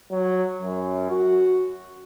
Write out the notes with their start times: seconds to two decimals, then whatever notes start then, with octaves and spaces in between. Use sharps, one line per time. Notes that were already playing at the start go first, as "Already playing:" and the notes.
0.11 F#3
0.62 F#2
1.10 F#4